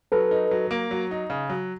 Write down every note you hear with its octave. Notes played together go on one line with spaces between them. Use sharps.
F#3 A4 B4
D#4
F#3
A#3
F#3
D#4
C#3
F#3